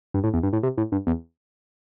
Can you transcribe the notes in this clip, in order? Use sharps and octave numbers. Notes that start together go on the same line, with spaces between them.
G2
A2
E2
G2
A2
C3
A2
G2
E2